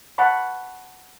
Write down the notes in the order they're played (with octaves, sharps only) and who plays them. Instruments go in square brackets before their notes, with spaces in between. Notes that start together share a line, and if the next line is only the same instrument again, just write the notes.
[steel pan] F#5 A5 B5 C#6